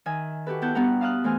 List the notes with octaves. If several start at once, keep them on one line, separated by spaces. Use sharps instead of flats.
D#3 E5 G#5
F#4 G4 A4 B4
B3 E4 F#5 A5 G6
G2 B2 B3 D4 F#5 A#5
F5 A5 D#6 F6 F#6
E3 A3 C5 G#5 F6